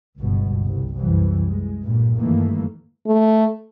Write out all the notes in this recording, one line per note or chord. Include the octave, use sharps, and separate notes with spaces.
G1 C#2 B2
C2
C2 F#2 E3
G#3
G2 A#2
G2 D#3 E3 A3 A#3
A3